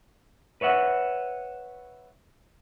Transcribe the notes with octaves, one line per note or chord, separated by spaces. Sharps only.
B4 C#5 E5 F#5